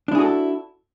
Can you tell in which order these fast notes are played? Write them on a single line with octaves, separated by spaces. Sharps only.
D4 E4 G#4 F#4 A4